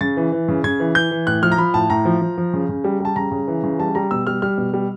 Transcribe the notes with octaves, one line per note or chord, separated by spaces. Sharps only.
C#3 A6
E3
E3
C#3
C#3 G#6
E3
E3 G6
E3
A2 F#6
F3 F6
A#5
F3 B5
A2 A5
A2 A#5
F3
F3
F3
C#3
C#3
G3
G3 A5
C#3 A#5
C#3
E3
C#3
G3 A5
G3 A#5
B2 E6
G3 F6
G3 F6
B2
G3